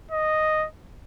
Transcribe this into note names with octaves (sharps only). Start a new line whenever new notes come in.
D#5